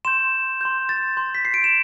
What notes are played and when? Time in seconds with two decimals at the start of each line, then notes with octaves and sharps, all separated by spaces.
0.05 C6 G6 E7
0.61 C6 G6
0.89 A6
1.17 C6 G6
1.35 B6
1.45 C7
1.54 D7
1.64 E7